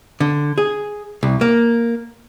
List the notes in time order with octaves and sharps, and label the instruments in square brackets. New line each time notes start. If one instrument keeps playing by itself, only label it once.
[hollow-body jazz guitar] D3
G#4
C2
A#3